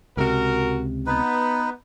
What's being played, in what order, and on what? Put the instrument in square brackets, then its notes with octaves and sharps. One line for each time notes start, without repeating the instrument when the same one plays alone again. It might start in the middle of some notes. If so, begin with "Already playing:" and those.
[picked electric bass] C#2 C3 [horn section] F#4 A#4
[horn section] B3 [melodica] D#4 B4